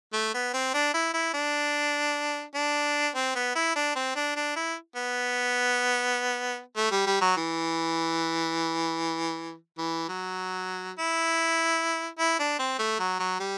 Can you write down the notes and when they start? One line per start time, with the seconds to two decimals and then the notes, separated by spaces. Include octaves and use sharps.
0.13 A3
0.34 B3
0.54 C4
0.74 D4
0.94 E4
1.14 E4
1.34 D4
2.55 D4
3.15 C4
3.35 B3
3.55 E4
3.76 D4
3.96 C4
4.16 D4
4.36 D4
4.56 E4
4.96 B3
6.77 A3
6.91 G3
7.07 G3
7.21 F#3
7.37 E3
9.78 E3
10.09 F#3
10.99 E4
12.19 E4
12.40 D4
12.59 C4
12.79 A3
13.00 F#3
13.20 F#3
13.40 G3